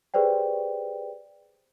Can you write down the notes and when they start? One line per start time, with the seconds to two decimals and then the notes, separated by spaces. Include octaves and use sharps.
0.14 G4 G#4 B4 C5 D5 G5